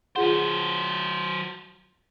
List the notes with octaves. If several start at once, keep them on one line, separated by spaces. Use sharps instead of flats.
F#3 F4 G#4 C5 F#5